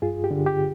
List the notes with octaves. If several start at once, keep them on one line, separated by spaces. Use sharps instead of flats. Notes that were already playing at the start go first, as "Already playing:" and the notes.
G2 F4 G#4
G4
D3
G4